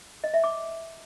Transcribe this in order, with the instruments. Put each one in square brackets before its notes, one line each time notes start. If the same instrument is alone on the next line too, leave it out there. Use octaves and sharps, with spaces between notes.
[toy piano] D#5
E5
D6